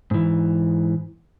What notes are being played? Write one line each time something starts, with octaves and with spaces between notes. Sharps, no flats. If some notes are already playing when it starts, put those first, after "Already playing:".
G#2 E3